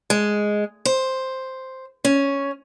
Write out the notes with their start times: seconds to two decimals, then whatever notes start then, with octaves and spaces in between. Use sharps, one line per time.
0.10 G#3
0.85 C5
2.05 C#4